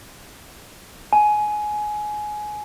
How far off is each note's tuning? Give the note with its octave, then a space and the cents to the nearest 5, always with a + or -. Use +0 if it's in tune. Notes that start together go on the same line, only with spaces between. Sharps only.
G#5 +20